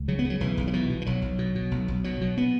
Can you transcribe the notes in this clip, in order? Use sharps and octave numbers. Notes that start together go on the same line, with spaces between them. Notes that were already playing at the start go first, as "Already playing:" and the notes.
Already playing: C#2
C#3 F#3
B3
C#3 F#3
B1 E3
B1
F#3
B2 E3
B2
E3
B1 F#3
B1
B2
B2
B1
B1
B2 F#3
B2
B3